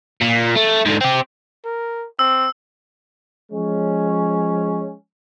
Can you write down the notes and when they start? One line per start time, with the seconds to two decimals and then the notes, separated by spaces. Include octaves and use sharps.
0.21 A#2
0.55 A3
0.85 G#2 D3
1.01 C4 G4
1.65 A#4
2.19 C4 E6
3.52 F3 G#3 C#4